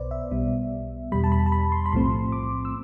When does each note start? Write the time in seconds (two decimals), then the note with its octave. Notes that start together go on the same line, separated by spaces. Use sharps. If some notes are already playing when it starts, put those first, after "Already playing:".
Already playing: B1 B2 B3 B4 C5 D5
0.11 E5
0.31 B1 B2 G3 B3
1.12 E2 B2 G3 B5
1.24 A5
1.32 B5
1.46 A5
1.52 B5
1.72 C6
1.86 B5
1.92 B1 A2 F3 A3 C4 C6
2.32 D6
2.65 E6